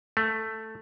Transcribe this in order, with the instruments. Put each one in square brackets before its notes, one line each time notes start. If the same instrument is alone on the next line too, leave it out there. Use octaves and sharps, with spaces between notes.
[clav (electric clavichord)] A3